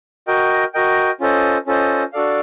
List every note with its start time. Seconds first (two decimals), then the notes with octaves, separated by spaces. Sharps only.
0.27 F#4 A#4 D#5 G5
0.74 F#4 A#4 D#5 G5
1.20 C#4 F4 A4 C5 D#5
1.67 C#4 F4 A4 C5 D#5
2.13 D4 F#4 A4 D5 F5